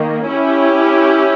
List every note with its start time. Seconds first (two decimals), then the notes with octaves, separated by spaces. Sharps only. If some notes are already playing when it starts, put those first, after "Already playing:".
Already playing: D#3 A#3
0.28 C#4 E4 G4